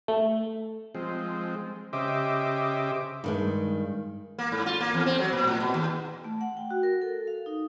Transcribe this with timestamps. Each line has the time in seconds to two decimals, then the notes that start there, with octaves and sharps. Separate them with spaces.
0.08 A3
0.95 F3 G#3 C4
1.93 C#3 G4 C5 D#5 E5 D6
3.24 G2 D#3 G#3
4.38 A#3
4.52 G#2
4.66 F4
4.80 A#3
4.94 E2
5.06 C4
5.19 F#3
5.33 A#2
5.47 A2
5.60 B2
5.74 D#2
6.24 A3
6.41 F#5
6.57 G5
6.71 F#4
6.83 A#4
7.01 A4
7.27 F5
7.46 D#4